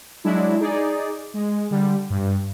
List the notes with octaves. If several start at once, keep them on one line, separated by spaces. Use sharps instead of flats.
F#3 G#3 D4 E4
D#4 G#4 D5
G#3
D3 G3
G2